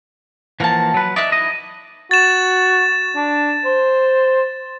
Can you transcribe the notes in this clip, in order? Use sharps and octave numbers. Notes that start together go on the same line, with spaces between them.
E3 F3 A#3 F#4 A5
F#3 B4
D#4 E4 D5 F#6
D#5
F#4 A6 E7
D4
C5